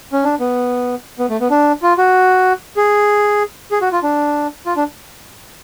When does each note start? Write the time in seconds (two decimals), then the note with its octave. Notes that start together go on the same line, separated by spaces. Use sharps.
0.12 C#4
0.24 D4
0.40 B3
1.19 B3
1.30 A3
1.40 B3
1.50 D4
1.82 F4
1.98 F#4
2.77 G#4
3.71 G#4
3.81 F#4
3.92 F4
4.03 D4
4.66 F4
4.76 D4